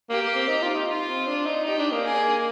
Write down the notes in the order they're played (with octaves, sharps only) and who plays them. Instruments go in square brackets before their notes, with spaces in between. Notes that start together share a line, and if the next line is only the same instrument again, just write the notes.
[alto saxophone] A#3 [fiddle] G4
[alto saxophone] A#3
C4
D#4
F4
D#4
[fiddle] F4
[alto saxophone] C4
D4
D#4
[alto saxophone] D#4 [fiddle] G4
[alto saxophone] D4
A#3
[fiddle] G#4